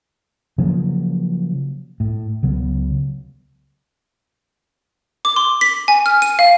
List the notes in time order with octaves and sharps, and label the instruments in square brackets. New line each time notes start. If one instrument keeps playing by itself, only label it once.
[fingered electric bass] C#3 F3 F#3 A#3
A2
C#2 C#3 F#3 B3
[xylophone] D6
C6
B6
G#5
F6
D#7
F5